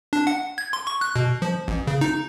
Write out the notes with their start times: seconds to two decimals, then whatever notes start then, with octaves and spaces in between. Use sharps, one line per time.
0.13 D4
0.27 F#5
0.58 G#6
0.73 C6
0.87 C#6
1.01 F#6
1.16 B2
1.42 F3
1.68 A1
1.87 C#3
2.01 D#4